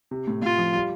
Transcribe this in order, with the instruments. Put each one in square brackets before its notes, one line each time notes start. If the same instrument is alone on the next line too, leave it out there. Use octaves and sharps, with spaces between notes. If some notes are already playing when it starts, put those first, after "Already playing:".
[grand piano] C3
A2
[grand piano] A2 [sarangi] F4
[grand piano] F3
G3